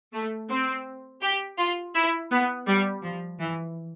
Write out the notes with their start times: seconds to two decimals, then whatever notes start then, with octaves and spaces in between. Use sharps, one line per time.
0.13 A3
0.50 C4
1.22 G4
1.58 F4
1.95 E4
2.31 B3
2.67 G3
3.03 F3
3.40 E3